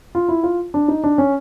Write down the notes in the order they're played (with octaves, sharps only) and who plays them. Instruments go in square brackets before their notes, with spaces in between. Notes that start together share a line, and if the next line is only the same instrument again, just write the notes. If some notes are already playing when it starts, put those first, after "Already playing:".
[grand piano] F4
E4
F4
D4
D#4
D4
C#4